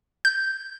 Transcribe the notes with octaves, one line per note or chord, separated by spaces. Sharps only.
G6